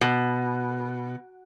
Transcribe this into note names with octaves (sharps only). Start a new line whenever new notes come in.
B2